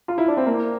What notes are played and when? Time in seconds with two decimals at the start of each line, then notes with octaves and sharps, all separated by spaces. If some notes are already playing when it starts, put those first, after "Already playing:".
0.08 F4
0.18 E4
0.28 D4
0.37 C4
0.46 A#3